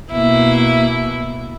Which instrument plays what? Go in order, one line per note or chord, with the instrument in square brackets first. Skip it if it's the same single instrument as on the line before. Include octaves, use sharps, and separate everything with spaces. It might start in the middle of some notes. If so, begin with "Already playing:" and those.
[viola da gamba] B2 A#3 E4